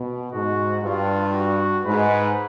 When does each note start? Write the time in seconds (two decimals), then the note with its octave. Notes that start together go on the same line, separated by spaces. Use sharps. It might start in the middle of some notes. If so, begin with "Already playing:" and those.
Already playing: B2
0.32 G#2 F#4
0.83 G2 F4
1.34 F#4
1.85 G#2 B4